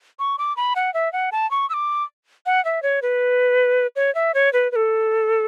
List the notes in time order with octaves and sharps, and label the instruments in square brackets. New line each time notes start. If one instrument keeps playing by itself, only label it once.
[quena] C#6
D6
B5
F#5
E5
F#5
A5
C#6
E6
D6
F#5
E5
C#5
B4
C#5
E5
C#5
B4
B4
A4